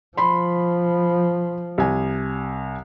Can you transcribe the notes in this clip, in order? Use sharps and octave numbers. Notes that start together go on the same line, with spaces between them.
F3 B5 C6
C2 G#5